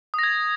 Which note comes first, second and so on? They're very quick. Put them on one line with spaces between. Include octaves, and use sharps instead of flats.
D#6 A#6 G#6